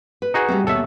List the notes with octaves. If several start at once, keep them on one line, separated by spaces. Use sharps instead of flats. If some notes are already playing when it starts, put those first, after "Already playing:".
B4
D#4 F#4 G#4
G3 A3 C4
D#2 B2 A4 C#5 E5